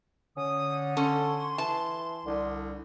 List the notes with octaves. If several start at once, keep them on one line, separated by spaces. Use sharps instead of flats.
D3 C#4 D#6
C#4 A4 C6
E3 A5
C2 D3